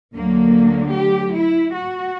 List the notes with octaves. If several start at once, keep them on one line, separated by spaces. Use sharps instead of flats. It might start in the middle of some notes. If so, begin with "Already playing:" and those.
D2 D3 F#3 A#3
G4
E4
F#4